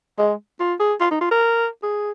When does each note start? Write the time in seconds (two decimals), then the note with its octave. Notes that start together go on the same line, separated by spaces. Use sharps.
0.18 G#3
0.60 F4
0.80 G#4
1.00 F4
1.11 D#4
1.21 F4
1.31 A#4
1.83 G#4